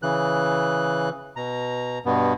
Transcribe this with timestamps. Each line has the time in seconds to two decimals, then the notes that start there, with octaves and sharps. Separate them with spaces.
0.03 C#3 E3 F#6
1.36 B2 A#5
2.05 G2 B2 B3